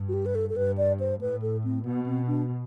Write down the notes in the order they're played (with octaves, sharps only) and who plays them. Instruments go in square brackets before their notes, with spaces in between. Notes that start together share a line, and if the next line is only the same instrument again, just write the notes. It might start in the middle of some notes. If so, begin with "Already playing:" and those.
Already playing: [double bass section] G2
[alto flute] F#4
G4
B4
A4
A4
[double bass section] G2 [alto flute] B4
[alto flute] D5
C5
[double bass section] A2 [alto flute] B4
[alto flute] A4
C4
[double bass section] B2 [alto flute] B3
[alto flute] C4
D4